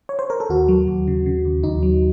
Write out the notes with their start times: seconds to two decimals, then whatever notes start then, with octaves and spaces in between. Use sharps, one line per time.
0.09 C#5
0.19 C5
0.30 A#4
0.40 A4
0.50 D#2 F#4
0.68 F#3
0.88 D#2
1.08 C#3
1.26 C#3
1.45 D#2
1.63 D#2 D#4
1.83 F#3